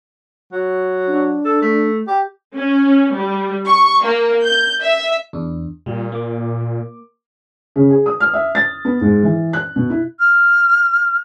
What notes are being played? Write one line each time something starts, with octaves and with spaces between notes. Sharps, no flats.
F#3
D4
A4
A3
G4
C#4
G3
C#6
A#3
G6
E5
E2 D4
A#2 G3
A#3 D6
C#3
G#4
D#6
F6
E5
A6
B3
G#2
E3
F#6
B2
E4
F6